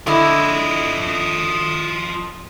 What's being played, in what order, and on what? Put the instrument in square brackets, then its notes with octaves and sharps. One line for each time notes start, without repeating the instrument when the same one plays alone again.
[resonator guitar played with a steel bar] D3 E4 [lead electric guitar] F3 D#5